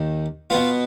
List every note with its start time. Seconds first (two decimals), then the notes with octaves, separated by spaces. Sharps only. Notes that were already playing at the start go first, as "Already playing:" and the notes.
Already playing: D#2 D#3
0.50 B2 B3 F4